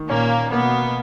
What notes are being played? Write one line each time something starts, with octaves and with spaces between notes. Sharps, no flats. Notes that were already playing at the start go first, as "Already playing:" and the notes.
Already playing: D#3
A#2 A#3 C#4
B2 A#3 B3